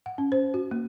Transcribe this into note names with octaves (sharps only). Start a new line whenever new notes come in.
F#5
C#4
C5
F#4
A#3